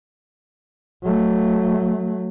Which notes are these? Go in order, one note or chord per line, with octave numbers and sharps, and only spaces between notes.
F#3 A3